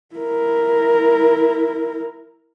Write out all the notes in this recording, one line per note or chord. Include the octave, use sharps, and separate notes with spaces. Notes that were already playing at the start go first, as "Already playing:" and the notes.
E4 A#4